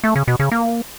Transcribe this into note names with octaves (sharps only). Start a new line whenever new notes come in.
A3
C#3
B2
C#3
A#3